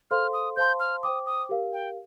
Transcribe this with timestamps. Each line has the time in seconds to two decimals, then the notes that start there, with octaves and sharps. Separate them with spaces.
0.11 A4 C5 F5 C6 F6
0.33 D#6
0.56 C5 F5 A5 C6 G6
0.80 F6
1.03 C5 G5 D6 D#6
1.26 D#6
1.49 G4 A#4 F5
1.73 G5